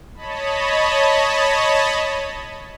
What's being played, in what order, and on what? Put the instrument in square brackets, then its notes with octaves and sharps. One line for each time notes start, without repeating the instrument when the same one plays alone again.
[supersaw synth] C#5 D#5 A5 B5